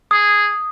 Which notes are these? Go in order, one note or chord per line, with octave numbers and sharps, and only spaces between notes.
G#4 D#6